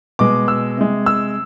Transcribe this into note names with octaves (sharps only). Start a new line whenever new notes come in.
B2 G#3 D6
E6
C3 G#3
E6